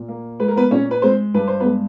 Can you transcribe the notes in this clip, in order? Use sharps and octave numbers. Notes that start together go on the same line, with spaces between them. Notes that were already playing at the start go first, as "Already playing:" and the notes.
Already playing: A#2
A#3
G#3 B4
A#4
B3 B4
A#2 C#4 C#5
B4
G#3 C4 C5
G2 B4
C5
B3 B4
G#3